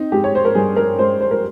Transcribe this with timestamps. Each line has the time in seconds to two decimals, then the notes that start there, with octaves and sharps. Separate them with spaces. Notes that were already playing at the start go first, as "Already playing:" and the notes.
Already playing: C4 D#4
0.12 G#3 G4
0.24 C#5
0.35 C5
0.45 A#4
0.55 G2 G#4
0.76 A#4
0.99 G#3 C5
1.21 C5
1.31 A#4